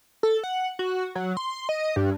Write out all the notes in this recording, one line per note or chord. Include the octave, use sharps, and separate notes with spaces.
A4
F#5
F#4
F#3
C6
D#5
G2